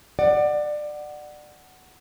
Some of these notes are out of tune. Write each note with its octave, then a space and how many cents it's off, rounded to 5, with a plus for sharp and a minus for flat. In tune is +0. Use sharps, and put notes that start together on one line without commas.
D5 +25 F#5 +5